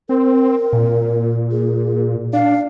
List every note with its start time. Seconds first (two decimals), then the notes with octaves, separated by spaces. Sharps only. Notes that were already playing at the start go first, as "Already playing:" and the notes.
0.09 C4 A#4
0.73 A#2
1.51 G#4
2.33 D4 F5